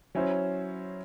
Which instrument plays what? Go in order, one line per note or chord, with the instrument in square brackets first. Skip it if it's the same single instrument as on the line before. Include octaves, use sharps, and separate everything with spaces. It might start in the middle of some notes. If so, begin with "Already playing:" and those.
[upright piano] F#3 C#4 E4 C5